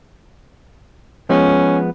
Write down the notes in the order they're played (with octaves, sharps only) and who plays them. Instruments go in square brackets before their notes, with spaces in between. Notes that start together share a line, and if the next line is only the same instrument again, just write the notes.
[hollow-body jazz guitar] F3 G#3 B3 [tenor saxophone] C#4